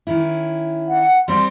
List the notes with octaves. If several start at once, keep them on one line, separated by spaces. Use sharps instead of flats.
D#3 C#4 E4
F#5
G3 C4 D5 C6